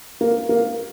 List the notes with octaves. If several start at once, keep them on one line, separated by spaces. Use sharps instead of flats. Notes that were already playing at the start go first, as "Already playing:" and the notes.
A#3
A#3